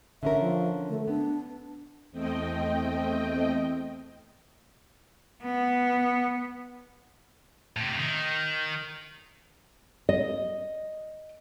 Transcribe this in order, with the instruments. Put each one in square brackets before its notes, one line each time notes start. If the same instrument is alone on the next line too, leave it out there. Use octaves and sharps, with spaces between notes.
[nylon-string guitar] D3 C#4 A#4 [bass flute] E5
[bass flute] F3
A3
[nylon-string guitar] B3 [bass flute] D4
[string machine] E2 A3 C4 D#5 G5
[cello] B3
[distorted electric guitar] A2 C3
D#3
[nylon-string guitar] D#5